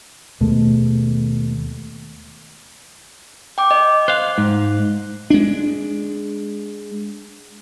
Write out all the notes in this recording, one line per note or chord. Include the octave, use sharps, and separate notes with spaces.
D#2 B2 G#3 A3
G5 D6
D#5
C5 F5 F#6
G#2
G#3 D4